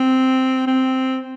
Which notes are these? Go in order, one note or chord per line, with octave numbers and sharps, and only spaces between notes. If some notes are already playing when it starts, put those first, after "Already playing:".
Already playing: C4
C4